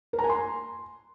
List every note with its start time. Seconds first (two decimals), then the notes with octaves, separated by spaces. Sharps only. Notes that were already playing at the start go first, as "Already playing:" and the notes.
0.13 A#4
0.19 A#5
0.24 G#5
0.29 C6